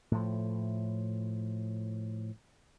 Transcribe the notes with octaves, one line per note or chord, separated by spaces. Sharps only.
A2 F3